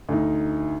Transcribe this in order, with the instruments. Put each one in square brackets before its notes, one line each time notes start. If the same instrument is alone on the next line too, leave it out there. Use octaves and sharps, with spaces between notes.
[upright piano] D2 D#4